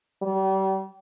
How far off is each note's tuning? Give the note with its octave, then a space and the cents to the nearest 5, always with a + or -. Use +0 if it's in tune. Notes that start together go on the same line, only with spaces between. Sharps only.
G3 -35